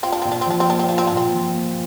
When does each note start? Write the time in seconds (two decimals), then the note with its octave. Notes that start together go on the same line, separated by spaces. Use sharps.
0.02 C4 F4
0.12 D4
0.22 A#2 C4
0.32 D4
0.41 C4
0.46 F3 D4
0.60 C4
0.69 A#3 D4
0.79 C4
0.89 D4 F4
0.98 C4
1.07 D4
1.12 A#2
1.17 C4
1.34 F3
1.55 A#3